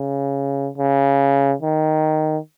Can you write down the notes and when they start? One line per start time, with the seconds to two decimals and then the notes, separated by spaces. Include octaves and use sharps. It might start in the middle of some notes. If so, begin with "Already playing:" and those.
Already playing: C#3
0.78 C#3
1.62 D#3